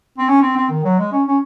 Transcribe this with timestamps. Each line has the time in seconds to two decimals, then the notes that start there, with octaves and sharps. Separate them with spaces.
0.18 C4
0.28 C#4
0.42 C4
0.56 C4
0.70 D#3
0.85 F#3
0.98 G#3
1.12 C#4
1.27 C#4